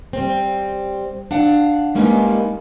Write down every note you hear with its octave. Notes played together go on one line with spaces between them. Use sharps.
G3 C4
D4 F5 F#5
G3 G#3 A#3 B3 C#4 D#4